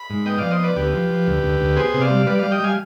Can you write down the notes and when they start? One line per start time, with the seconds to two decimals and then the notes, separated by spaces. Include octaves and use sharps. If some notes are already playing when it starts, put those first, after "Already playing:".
Already playing: B5
0.10 G#2
0.26 B3 D#5 G5
0.38 F3 D5 F5
0.50 C5 D#5
0.60 B3 B4 D5
0.76 D2 G4 B4
0.93 F3
1.10 F3
1.27 D2
1.43 D2
1.60 D2
1.76 B3 G#4 C5
1.94 C3
2.01 D5 F5
2.10 G3
2.26 G3 B4 D5
2.39 G3 D5 F5
2.51 D#5 G5
2.60 G3 F5 G#5